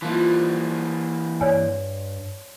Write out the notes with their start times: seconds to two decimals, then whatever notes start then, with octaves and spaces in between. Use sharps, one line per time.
0.02 E3 F3 A#3
1.41 G2 C#5 D5 G#5